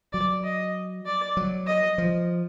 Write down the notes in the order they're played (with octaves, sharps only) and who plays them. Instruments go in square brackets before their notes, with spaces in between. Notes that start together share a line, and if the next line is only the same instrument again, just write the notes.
[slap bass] F#3 [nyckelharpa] D5
[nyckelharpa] D#5
D5
[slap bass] F#3
[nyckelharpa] D#5
[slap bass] F3